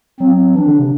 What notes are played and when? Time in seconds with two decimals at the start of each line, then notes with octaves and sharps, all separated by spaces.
0.20 F#3 C4
0.55 E3 D4
0.67 D3
0.79 C3